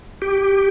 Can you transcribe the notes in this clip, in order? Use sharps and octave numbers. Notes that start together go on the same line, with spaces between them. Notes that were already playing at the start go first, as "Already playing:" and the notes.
G4